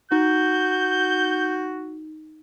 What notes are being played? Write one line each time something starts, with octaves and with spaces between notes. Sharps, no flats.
D#4 F#4 G6